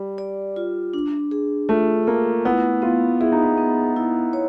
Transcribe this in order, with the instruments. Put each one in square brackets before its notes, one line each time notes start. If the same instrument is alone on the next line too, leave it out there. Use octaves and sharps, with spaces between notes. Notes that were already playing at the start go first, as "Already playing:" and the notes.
Already playing: [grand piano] G3
[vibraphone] D5
F4
D4
G#4
[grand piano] A3 [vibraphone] F4
[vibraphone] A3 [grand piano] A#3
[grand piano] B3 [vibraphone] E4
[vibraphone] B3 [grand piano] F4
[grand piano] E4 [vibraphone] G#4
[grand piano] D#4
E4
[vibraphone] B3
E4
C#5